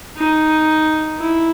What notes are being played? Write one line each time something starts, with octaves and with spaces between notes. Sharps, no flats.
D#4
E4